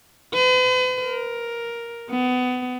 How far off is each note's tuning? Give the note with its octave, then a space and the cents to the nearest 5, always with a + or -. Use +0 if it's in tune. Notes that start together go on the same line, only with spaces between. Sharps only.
B4 +40
A#4 +10
B3 +25